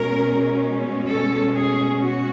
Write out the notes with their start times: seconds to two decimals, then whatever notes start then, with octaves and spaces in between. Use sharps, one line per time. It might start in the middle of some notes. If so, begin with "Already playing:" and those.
Already playing: B2 G#3 C#4 A#4
1.07 A4
1.53 G#4
1.97 F#4